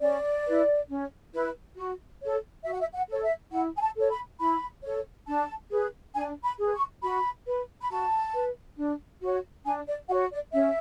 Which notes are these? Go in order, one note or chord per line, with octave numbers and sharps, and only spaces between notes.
C#4 D5
E4 B4
C#4
E4 B4
F#4
A4 C#5
F#4 E5
F#5
E5
F#5
A4 C#5
E5
E4 F#5
G#5
A5
A4 C#5
B5
E4 B5
A4 C#5
D4 A5
G#4 B4
D4 G#5
B5
G#4 B4
C#6
F#4 B5
B4
B5
F#4 A5
B4
D4
F#4 C#5
D4 G#5
D5
F#4 C#5 F#5
D5
C#4 E5